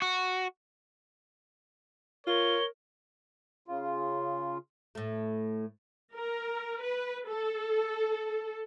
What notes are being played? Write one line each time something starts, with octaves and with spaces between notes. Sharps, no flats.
F#4
F4 A#4 C#5 G7
C#3 F4
A2 A3
A#4
B4
A4